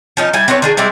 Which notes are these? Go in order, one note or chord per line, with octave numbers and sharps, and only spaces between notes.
F3 C#4 D#4
G3 E4 G#5
C4 D4 B4 C#5
D#3 D4 G#4
G3 G#3 C4 E4